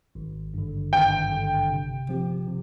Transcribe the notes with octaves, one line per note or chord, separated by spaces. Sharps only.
G#1
G2 D3
G#1 G5
G2 D3
C3
F3 C4 G4
C3